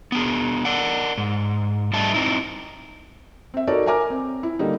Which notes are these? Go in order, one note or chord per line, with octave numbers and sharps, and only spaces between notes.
B3 D4 G#4
A#4 D5 F#5
G#2
G3 A3 D4 D#5 E5 A5
C4 D#4 E4
C4 E5
D#4 F#4 A4 A#4 C#5 D5
A#4 E5 G#5 A#5 D6 F6
C4
E4
D3 G3 A#3 D#4